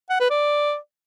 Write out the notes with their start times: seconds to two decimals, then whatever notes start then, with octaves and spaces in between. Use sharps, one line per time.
0.10 F#5
0.20 B4
0.30 D5